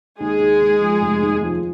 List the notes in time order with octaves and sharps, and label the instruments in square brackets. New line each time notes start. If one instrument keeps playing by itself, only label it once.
[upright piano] D#2 [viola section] G#3 G#4
[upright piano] D#2
D#2
F3
F1
D#2
F3